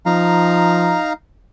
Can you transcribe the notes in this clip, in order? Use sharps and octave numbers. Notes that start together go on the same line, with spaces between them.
F3 D#4 F5 A#5